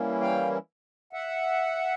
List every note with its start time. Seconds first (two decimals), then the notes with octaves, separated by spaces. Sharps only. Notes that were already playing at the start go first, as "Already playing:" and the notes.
Already playing: E3 G3 A#3 C#4 E4
0.21 F5 G5
1.13 E5 F#5